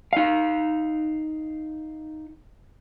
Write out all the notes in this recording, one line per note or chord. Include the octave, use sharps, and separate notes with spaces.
D#4 F5